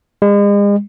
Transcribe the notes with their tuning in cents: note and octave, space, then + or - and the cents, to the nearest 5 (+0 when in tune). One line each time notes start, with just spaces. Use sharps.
G#3 -40